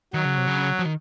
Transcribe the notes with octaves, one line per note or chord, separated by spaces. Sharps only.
D#3 F#3
C#3
C3
C#3
F3
D#3